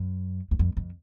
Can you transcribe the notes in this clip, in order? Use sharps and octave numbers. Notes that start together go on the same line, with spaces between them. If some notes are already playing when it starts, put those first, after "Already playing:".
Already playing: F#2
E2
F2
F2